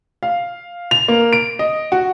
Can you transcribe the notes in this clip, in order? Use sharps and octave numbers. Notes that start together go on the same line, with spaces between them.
F5
F7
A#3
D7
D#5
F#4